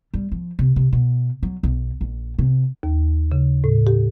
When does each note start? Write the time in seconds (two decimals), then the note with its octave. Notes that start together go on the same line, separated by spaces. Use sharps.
0.14 G3
0.32 F3
0.59 C3
0.76 C3
0.93 B2
1.43 F#3
1.63 B1
2.01 A#1
2.39 C3
2.83 D#2
3.32 C#3
3.64 A2
3.87 G4